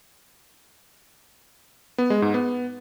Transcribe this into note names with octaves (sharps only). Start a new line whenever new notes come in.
B3
G#3
G#2
B3